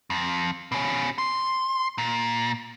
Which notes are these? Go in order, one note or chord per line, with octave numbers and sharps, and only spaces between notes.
F2
B2 C#4
C6
A#2